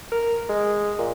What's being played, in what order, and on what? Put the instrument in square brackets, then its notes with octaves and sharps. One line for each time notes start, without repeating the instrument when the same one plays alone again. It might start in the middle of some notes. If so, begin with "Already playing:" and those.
[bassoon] A#4
G#3
A#2